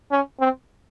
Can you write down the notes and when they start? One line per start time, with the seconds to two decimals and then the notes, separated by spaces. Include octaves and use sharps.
0.12 C#4
0.40 C4